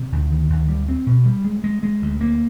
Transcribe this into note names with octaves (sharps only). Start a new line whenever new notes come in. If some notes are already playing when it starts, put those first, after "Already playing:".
Already playing: C3
D2
D#3
D2
G3
C4
B2
G3
G#3
G#3
G#3
D2
A#3